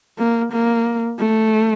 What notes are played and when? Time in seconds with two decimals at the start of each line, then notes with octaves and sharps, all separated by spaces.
0.18 A#3
0.52 A#3
1.19 A3